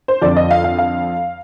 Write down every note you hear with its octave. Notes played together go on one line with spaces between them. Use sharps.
C5
F2 D3 F3 D5
D#5
F5
F5
F5